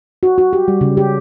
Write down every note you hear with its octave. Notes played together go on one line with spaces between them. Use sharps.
F#4
F#4
G4
G3
C#3
G4